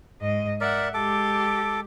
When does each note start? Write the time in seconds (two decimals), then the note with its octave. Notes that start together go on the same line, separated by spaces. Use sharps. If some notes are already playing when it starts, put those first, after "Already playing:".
0.20 G#2 D#5
0.61 A#4 D5 E5 F#5
0.94 G#3 G4 A4 D6